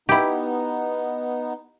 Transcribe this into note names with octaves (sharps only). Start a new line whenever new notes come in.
B3 D#4 E4 G4